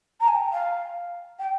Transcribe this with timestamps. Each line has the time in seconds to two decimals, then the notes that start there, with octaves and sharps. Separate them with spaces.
0.20 A#5
0.28 G#5
0.35 G5
0.52 F5
1.39 G5